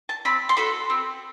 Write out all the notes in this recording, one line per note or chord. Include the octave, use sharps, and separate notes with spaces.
A5
C4 B5
C6
F#4 A4 B5
C4